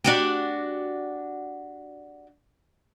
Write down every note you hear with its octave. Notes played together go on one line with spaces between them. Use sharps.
D4 F#4 G4